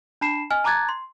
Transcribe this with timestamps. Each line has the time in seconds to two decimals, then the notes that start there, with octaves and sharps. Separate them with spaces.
0.21 D4 A5 B5 C7 E7
0.51 D#5 G#5 F6
0.64 A5 A#5 D6 F#6 G#6 A6
0.89 C6